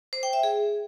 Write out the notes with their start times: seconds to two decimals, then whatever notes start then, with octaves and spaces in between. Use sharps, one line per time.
0.13 C5
0.23 G5
0.33 E5
0.43 G#4